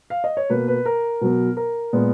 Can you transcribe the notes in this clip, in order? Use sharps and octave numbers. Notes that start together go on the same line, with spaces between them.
F5
D#5
C#5
B2 A#3 B4
B4
A#4
B2 F#3 B3
A#4
A#2 G#3 B3